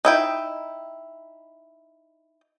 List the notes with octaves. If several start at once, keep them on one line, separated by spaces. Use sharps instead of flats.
D#4 E4 G5